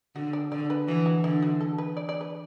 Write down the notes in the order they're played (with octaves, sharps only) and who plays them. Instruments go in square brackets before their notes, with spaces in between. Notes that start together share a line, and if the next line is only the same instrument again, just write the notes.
[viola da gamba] D3 [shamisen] F#4
[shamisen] D5
[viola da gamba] D3 [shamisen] D5
[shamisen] B4
[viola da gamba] E3 [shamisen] F#4
[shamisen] F#4
[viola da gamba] D3 [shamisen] E4
[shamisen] F#4
A4
B4
D5
D5
B4